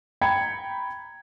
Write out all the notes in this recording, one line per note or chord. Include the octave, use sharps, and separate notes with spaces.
G5 A#5 B5 G#6 C#7